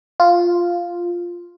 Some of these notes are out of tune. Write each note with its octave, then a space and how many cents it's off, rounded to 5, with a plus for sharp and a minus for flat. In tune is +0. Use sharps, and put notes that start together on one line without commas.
F4 +0